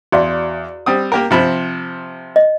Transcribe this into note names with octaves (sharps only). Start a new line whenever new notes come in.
E2 F#4 D5 F5
G3 C4 D#6
A#3 G4 A#4
C3 F3 B5
D#5